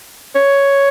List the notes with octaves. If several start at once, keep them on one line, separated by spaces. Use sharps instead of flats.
C#5